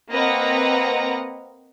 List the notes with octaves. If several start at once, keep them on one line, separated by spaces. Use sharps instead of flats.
A#3 C4 B4 D#5 F#5 A#5